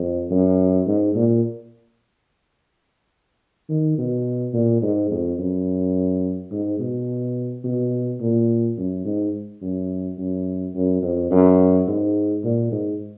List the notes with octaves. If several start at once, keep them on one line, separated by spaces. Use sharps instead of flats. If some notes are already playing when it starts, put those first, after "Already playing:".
Already playing: F2
F#2
G#2
A#2
D#3
B2
A#2
G#2
F2
F#2
G#2
B2
B2
A#2
F#2
G#2
F#2
F#2
F#2
F2
F#2
G#2
A#2
G#2